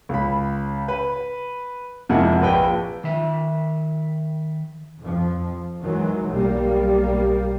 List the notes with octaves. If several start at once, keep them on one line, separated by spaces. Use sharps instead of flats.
C#2 B5
B4
F2 C3 G#3 A#3 E4 F#5
A#1 B4 G5
D#3 E5
F2 F3
D#3 E3 F#3 G#3
B1 G3 A#3